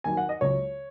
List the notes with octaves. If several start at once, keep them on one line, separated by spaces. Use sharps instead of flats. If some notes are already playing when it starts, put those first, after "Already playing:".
D#2 D#3 F#3 G#5
F#5
D#5
C#2 C#3 F#3 C#5